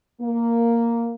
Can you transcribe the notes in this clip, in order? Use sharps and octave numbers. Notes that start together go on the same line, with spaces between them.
A#3